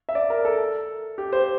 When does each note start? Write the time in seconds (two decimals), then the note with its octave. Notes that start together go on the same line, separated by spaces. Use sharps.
0.09 E5
0.15 D5
0.30 A#4
0.45 A4
1.18 G4
1.33 C5